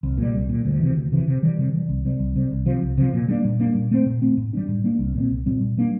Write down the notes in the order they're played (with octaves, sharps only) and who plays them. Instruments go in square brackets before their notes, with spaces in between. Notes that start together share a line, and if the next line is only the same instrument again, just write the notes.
[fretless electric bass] C2
A#2 G3
C2
A#2 G3
D2
C3 E3
D2
C3 E3
C3
E3 G3
C3
E3 G3
C2
C3 G3
C2
C3 G3
C2
C3 F3
C2
C3 F3
A#2
G3 A#3 D4
A#2
G3 A#3 D4
A#2
A3 C4
A#2
A3 C4
A2
G3 A#3 D4
A2
G3 A#3 D4
C2
A#2 G3 C4
C2
A#2 G3 C4
A#2
G3 A#3 D4